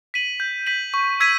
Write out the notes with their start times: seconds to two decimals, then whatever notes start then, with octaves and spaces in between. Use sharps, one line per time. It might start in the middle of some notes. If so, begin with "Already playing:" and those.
0.14 B6 D#7 F#7
0.40 G6
0.66 B6 D#7 F#7
0.94 C#6
1.20 E6 G#6 B6 D#7